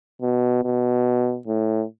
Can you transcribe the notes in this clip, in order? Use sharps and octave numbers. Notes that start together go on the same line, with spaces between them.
B2
B2
A2